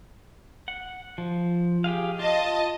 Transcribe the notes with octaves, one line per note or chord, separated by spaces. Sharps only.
F#5
F3
G4 G#4 F5
F4 D#5 A5